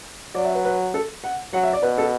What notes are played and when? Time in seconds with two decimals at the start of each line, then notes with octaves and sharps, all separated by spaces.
0.35 F#3 D5
0.45 E5
0.55 B4
0.65 B4
0.94 A4
1.24 F#5
1.53 F#3 F#5
1.63 E5
1.73 D5
1.82 B2 B4
1.98 A4